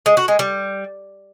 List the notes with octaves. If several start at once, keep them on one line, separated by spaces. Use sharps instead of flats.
G#3
F#4
G#3
G3